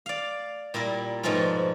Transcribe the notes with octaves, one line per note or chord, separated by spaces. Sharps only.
D5 F5
A#2 G3 E4 A#4
G#2 B2 F3 A3 C#4 F4